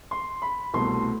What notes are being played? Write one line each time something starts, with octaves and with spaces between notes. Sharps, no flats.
C6
B5
C2 B2 A3 C6